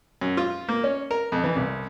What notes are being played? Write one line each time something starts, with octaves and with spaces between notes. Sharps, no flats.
F#2
F4
A#3
C#4
A#4
F2
E3
C2